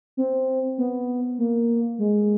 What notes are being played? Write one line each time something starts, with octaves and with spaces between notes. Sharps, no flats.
C4
B3
A#3
G#3